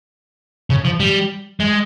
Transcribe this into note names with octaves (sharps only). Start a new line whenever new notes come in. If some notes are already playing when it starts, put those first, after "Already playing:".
C#3
F3
G3
G#3